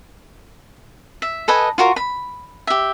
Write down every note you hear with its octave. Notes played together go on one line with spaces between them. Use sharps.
E5
A4 B4 D#5 G#5
F4 F#4 A#4
B5
G4 E5